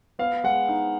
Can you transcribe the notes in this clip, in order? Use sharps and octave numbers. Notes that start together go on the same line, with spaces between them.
B3 F5
G#3 F#5
D#4